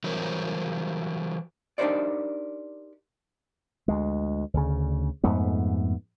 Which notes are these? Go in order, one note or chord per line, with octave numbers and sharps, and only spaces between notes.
E3 F#3 G3 A#4 C5 C#5
D4 D#4 G4 A#4 C5 D5
D2 G#3
D2 C#3
F2 G#2 A3 B3